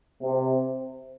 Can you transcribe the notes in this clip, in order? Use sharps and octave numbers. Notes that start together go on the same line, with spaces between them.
C3